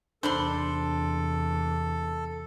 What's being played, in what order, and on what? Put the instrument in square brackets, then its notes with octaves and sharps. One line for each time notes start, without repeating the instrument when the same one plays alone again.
[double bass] E2 C3 [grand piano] D4 [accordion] A4 [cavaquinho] C5 B5 C6